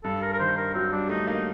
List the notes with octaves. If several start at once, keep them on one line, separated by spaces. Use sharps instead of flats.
G2 A4
A#4
A#4
D#3 C5
A#4
F#3 C4
G3 D4
A3 D#4
A#3 D#4